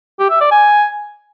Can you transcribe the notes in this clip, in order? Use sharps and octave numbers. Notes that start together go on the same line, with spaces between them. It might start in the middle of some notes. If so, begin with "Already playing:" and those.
G4
E5
D5
G#5